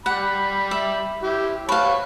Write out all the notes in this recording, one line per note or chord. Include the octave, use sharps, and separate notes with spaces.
G3 F#5 B5
E5
E4 G4
B4 C#5 F5 F#5 A5